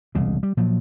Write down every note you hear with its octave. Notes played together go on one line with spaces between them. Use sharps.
E1 C2 C#3
G3
A#2 F3 F#3